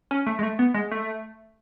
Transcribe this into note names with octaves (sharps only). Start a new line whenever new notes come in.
C#4
A3
G#3
A3
B3
G#3
A3